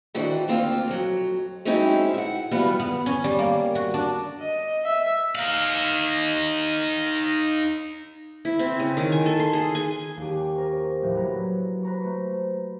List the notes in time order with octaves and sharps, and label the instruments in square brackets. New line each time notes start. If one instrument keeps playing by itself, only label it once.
[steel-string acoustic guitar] D#3 E3 D4 F#4 C5
D2 A#3 C4 F4 G5
F2 F#3
F#3 G#3 C4 C#4 D#4 E4
E5 F#5
E3 F#3 G3 B3 F4
[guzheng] B3
C#4
G3
A#3
F#4
D4
[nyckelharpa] D#5
E5
[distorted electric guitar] D#4 F5
[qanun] E4
C4
C#3
D#3
G#5
A4
C6
G#4
G#5
[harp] D#2 C#4 G4
A#4 C5 C#6
A2 C3 F3 A3
F#3 F#4 B4 A#5
B4 C5 A#5 C#6
A3